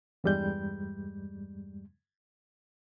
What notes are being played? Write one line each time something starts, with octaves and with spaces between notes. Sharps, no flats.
E2 G2 G3 G#3 G6